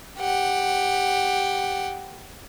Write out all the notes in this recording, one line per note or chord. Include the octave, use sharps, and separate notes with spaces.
G4 F#5